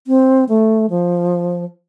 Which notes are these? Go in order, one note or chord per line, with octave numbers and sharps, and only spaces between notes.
C4
A3
F3